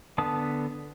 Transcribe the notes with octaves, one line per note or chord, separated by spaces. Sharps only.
D3 B3 A5 D#6